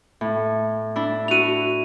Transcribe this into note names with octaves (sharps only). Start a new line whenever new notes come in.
A2
D4 E4
E4 F#4 D#7 F7